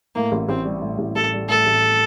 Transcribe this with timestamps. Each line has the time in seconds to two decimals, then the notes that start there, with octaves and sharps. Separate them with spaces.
0.15 A2 A#3
0.32 A1
0.49 A1 C4
0.65 G3
0.82 A2
0.99 A1
1.16 A1 A4
1.33 G3
1.49 A2 A4
1.66 A1